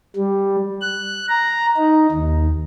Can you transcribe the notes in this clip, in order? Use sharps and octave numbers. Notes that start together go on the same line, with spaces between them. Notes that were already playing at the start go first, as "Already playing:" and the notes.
G3
F#6
A#5
D#4
D#2